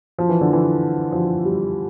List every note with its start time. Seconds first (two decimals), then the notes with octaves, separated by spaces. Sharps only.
0.18 F3
0.29 E3
0.41 D3
0.52 E3
1.12 F3
1.45 G3